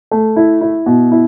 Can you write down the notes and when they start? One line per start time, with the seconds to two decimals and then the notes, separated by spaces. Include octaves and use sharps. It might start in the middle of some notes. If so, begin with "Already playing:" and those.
0.11 A3
0.36 E4
0.61 E4
0.86 B2
1.11 E4